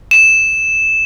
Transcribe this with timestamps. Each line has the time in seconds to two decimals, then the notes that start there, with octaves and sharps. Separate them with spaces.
0.11 E7